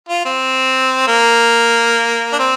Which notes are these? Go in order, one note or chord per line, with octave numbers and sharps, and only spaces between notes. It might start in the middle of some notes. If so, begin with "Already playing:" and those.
F4
C4
A#3
D4
C4